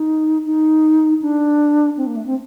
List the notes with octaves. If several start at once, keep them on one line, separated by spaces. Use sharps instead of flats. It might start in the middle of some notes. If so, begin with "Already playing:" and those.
Already playing: D#4
D#4
D4
C4
A#3
A3
C4